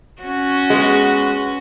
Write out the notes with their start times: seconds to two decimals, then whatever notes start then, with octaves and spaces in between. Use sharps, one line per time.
0.21 C#4 F#4
0.70 G#3 B3